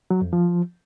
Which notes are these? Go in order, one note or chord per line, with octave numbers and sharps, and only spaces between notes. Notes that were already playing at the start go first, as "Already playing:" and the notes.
F#3
F2
F3